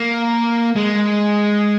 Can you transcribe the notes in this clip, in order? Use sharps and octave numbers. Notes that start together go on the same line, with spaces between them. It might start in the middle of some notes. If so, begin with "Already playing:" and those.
Already playing: A#3
G#3